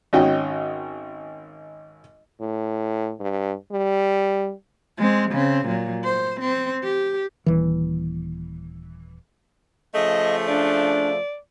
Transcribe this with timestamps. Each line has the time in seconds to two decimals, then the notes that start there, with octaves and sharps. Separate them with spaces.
0.13 G#1 C#4 F#4 D#5 G5
2.41 A2
3.20 G2
3.72 G3
4.97 G#3 C4
5.31 C#3 C4
5.66 A#2 F#3
6.04 C5
6.41 C4
6.84 G4
7.46 D#1 E3
9.94 C#3 F3 A3 D#5
10.48 D4 D5